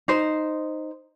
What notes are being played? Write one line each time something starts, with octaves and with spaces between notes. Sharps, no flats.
D#4 C5